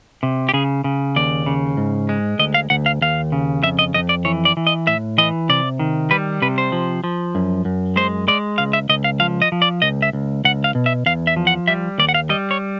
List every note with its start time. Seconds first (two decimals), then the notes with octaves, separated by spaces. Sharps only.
0.23 C3
0.49 G4
0.54 C#3 G#4
0.84 C#3
1.16 D#2 D5
1.46 C#3
1.77 G#2
2.09 G#3
2.39 D2 D#5
2.54 F5
2.70 D2 F#5
2.86 F5
3.01 D#2 F5
3.32 C#3
3.63 F2 E5
3.79 D#5
3.94 F2 D#5
4.09 D5
4.25 E3 C#5
4.45 D5
4.57 E3
4.67 D#5
4.87 A2 E5
5.18 E3 D#5
5.49 C3 D5
5.79 D#3
6.11 G3 B4
6.42 C3 B4
6.58 C5
6.72 F3
7.04 F3
7.35 F#2
7.65 F#2
7.96 G#3 C5
8.28 G#3 D5
8.58 C#2 F5
8.73 E5
8.89 C#2 D#5
9.04 F5
9.20 F3 F5
9.42 D#5
9.52 F3
9.62 D5
9.82 C#2 D#5
10.02 E5
10.13 C#2
10.45 C#2 F#5
10.64 F5
10.75 B2
10.86 E5
11.06 E2 F5
11.27 E5
11.36 F3
11.47 F#5
11.67 G3 E5
11.98 D#2 D5
12.09 F#5
12.14 F5
12.30 G3 D#5
12.51 C#5